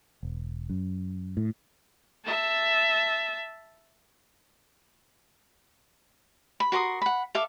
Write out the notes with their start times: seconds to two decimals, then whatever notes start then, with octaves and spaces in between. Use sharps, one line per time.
0.23 E1
0.70 F#2
1.37 A2
2.25 E5 A5
6.60 B5
6.72 F#4 A#4 C6 D#6
7.02 F#5 B5
7.35 A4 E5 F5 D6